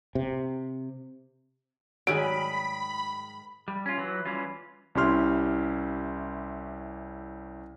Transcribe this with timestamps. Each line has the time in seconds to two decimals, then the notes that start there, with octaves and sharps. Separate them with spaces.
0.15 C3
2.07 G#2 D#3 F#3 G3 G#4 G#5 B5 D7
3.68 G3
3.86 C#4 F4
3.98 E3 F#3
4.25 E3 G3 C#4 F4
4.95 C2 C#4 E4 G4 C6 F6